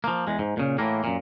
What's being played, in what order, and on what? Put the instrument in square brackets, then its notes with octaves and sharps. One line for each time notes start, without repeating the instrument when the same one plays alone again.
[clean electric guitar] F3 A#3
E2 G#3
G#2
A#2 C#3
A2 E3 A#3
F#2 A#2